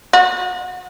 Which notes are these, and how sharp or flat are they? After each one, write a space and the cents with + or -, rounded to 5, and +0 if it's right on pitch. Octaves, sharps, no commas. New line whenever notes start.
F#4 -20